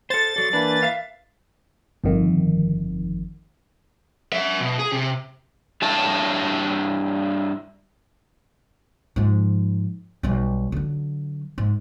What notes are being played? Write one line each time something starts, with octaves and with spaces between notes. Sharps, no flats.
A4 C5 A6
F#3 A4 D5
E3 A#3 D4 B4
E5 F5
G1 F2 D#3
F#3 E5
B2
G#4
C3
G2 E4 C#5 A5
G#2 F3
B1 G3
D3 F#3
G#2